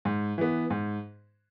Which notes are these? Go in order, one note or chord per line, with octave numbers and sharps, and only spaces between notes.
G#2
E3 B3
G#2